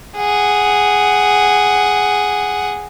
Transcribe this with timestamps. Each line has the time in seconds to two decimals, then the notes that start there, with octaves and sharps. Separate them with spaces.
0.17 G#4 F#5